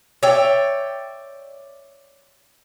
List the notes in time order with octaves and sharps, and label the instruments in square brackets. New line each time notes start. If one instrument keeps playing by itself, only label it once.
[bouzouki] C#5 D5 E5 G5